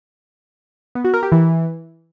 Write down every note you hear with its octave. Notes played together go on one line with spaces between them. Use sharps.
B3
F#4
A#4
G4
E3